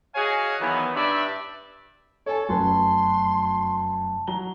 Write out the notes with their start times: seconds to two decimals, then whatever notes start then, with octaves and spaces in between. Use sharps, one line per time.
0.15 F#4 G#4 C#5 D#5 F5 G#5
0.60 D#3 E3 F#3 B3
0.95 G2 D5 E5
2.26 A4 C#5 G#5
2.49 F1 F#2 F#3 A3 C#4 B4 A5 C6
4.27 F#3 A#5 G7